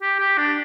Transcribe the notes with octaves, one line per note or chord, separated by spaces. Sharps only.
G4
G4
D4